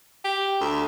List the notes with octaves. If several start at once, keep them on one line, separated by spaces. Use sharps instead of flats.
G4
D2